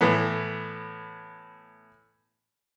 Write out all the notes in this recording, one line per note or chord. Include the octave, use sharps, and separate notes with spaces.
A2 E3 B3